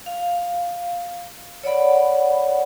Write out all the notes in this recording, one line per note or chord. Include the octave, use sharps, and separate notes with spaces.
F5
C#5 D5 F#5 B5